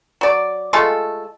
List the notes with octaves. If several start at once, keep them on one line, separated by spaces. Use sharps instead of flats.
F#3 D5
G#3 A3 F4 A4